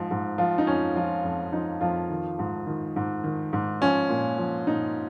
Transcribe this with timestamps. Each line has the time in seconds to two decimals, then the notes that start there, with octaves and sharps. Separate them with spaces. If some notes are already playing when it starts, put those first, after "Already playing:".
Already playing: G#2 F3
0.11 G#2
0.38 F3 F4
0.58 D#4
0.67 F2 C#4
0.95 F3 F4
1.24 F2
1.52 F3 D#4
1.81 F2 F3 F4
2.10 D#3
2.39 G#2
2.67 D#3
2.96 G#2
3.24 D#3
3.53 G#2
3.81 F3 C#4
4.09 A#2
4.38 F3
4.66 A#2 D#4